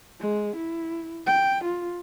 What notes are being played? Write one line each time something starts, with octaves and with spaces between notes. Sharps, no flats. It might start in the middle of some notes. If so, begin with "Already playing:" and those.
G#3
E4
G5
F4